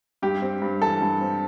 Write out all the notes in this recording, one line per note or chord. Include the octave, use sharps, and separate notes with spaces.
G2 G4
C4
G2
E3 A4
G2
C4